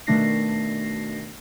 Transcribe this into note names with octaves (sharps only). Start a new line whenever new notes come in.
B2 D#3 A3 D4 A#6 C7